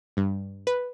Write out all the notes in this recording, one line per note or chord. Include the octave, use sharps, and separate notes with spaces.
G2
B4